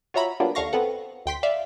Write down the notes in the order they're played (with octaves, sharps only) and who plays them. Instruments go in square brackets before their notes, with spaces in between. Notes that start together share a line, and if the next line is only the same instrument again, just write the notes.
[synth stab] F4 F#4 C#5 E5 A#5 B5
F#3 G3 A#3 B3 D4 F4
D#2 D3 A3 F5 C#6 A#6
B3 C4 A4 F#5
D2 G5 C6 B6
D5 E5 F5